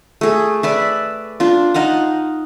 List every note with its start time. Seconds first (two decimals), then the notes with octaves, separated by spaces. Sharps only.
0.21 A3 G#4
0.63 B4 D5 E5
1.40 D4 F4
1.74 D#4 D#5 F5 F#5